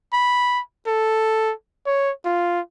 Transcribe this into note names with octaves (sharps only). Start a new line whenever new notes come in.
B5
A4
C#5
F4